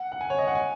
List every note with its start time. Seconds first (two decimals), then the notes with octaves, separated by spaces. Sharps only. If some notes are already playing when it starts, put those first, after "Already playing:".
Already playing: F#5
0.12 F#5
0.21 G#5
0.30 C#5
0.38 D#5
0.47 F#5
0.55 G#5